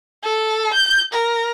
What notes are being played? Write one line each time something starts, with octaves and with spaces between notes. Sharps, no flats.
A4
G6
A#4